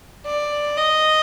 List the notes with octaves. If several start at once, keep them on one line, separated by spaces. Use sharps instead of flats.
D5
D#5